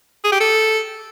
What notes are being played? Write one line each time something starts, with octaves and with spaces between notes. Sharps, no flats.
G#4
G4
A4